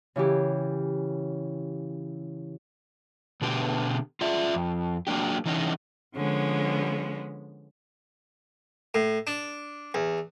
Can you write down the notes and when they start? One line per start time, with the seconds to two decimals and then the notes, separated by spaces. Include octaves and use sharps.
0.16 C#3 E3 E4 G4
3.42 B2 D3 B3 G4
4.21 F4 D5 E5
4.54 F2
5.07 F#3 A#3 D4 G4
5.46 E3 C#4 D#4 D#5
6.15 D3 F3 G#3 B3 C#4
8.94 A2
9.27 D4
9.94 E2